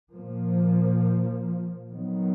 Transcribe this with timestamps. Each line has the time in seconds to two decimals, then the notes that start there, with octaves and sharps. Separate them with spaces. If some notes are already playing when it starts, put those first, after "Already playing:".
0.12 A#2 F3 A#3
1.91 D#3 F#3 B3